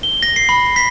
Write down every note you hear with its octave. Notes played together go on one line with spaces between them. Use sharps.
G7
A#6
C7
B5
B6